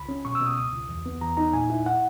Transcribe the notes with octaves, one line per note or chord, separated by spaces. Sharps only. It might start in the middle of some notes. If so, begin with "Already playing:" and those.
Already playing: C#2 B5
C#4
B2 C#6
E6
B2
D#6
C#2 D#6
C#2
E2
B3
E2 A#5
D#4 A#5
A#2 G#5
E4
F#5